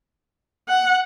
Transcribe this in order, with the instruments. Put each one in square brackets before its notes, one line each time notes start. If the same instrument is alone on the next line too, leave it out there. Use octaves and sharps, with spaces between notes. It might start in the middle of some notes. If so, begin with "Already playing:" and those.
[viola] F#5